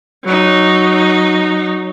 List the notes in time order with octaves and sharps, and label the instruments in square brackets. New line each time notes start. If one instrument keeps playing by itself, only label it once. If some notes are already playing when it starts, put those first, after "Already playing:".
[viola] F#3 D#4